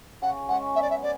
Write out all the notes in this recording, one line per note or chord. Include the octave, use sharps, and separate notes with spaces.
C#3 F#5
G#3 C#4 F#5
B3 E5
D5
E5
G#4 D5